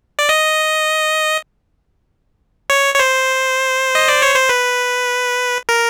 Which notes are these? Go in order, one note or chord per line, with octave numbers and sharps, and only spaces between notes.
D5
D#5
C#5
C#5
C5
D#5
D5
C#5
C5
B4
A#4